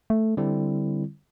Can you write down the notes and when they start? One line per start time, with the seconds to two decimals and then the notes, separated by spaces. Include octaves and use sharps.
0.10 A3
0.37 D3 G3 C4 E4